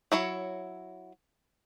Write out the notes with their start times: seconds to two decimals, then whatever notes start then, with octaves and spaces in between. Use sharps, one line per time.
0.12 F#3 E4 C#5